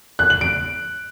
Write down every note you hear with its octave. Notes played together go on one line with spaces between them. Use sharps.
F#6
F#7
D7